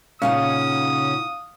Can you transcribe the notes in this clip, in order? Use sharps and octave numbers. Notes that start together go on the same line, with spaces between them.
A#2 C#3 C#4 D#4 F5 F#5 D#6